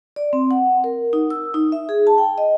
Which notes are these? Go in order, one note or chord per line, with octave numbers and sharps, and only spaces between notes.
D5
C4
F#5
A#4
D#4
E6
D#4
E5
G#4
A5
G5
D#5